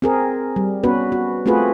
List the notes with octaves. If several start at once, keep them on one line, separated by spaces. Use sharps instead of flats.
C4 G#4 A#4
G3
B3 C#4 F#4 B4
F#4
A3 C4 F4 F#4 G#4 B4